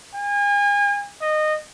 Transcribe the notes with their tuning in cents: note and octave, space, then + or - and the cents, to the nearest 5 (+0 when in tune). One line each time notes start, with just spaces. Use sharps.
G#5 -35
D#5 -20